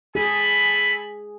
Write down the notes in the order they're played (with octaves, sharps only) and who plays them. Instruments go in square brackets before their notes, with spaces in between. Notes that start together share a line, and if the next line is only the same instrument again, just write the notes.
[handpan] G#4 [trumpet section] A4 G#5 B5